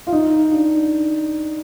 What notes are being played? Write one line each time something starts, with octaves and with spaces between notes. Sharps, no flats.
F4
D#4
D4